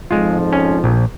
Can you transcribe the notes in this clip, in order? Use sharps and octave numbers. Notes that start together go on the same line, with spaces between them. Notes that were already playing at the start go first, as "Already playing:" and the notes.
F2 G#2 F3 G#3 F4
C#4
A#1